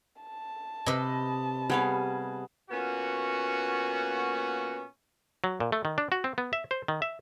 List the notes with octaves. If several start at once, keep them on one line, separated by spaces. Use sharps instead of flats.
A5
C3 B4 D#5 B5
G3 B3 G#4 C#5 F5
A#2 A#3 B3 C#4 F#4
F#3
A#2
A3
D#3
D4
F#4
C4
B3
E5
C5
D#3
E5